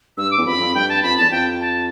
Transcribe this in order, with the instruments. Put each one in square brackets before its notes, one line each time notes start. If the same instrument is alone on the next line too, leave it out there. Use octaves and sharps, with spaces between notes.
[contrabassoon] G2 [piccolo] E6
[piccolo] D6
[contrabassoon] E2
[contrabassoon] F2 [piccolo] B5
[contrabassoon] F2
[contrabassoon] G2 [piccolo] G5
[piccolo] A5
[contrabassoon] F2 [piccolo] B5
[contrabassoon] E2 [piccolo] A5
[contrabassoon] F2 [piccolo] G5
[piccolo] A5